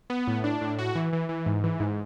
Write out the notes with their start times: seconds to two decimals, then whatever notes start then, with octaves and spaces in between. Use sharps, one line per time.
0.10 B3
0.27 A2
0.44 D4
0.61 A2
0.79 F#4
0.95 E3
1.13 E3
1.29 E3
1.46 G#2
1.64 E3
1.80 G#2